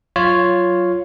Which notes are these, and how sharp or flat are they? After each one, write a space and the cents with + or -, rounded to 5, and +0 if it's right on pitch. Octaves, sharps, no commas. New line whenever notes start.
F#3 +0 F4 +0 C#5 +0